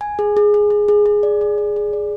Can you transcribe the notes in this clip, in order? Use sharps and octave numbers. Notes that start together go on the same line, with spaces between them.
G#5
G#4
G#4
G#4
G#4
G#4
G#4
D5
G#4
D5
G#4
D5